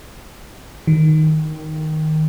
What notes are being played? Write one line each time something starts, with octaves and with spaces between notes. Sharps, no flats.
D#3